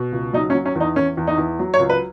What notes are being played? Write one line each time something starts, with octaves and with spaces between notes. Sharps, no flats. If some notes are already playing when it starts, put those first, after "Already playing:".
Already playing: B2
C#2
F#3 D#4
C#4
F#3
C#4
E2
D#4
E2 C#4
E2
D#4
E2
F#3
C#5
C#2
B4